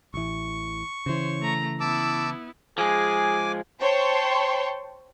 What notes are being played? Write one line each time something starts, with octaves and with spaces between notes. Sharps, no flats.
A1 E3 C#6
C#3 E3 C5 C#5
A3 A#5
B3 E4 A5 D6 E6
F3 G#3 G#4 G#5 D6
C5 C#5 G5 A5 C6 C#6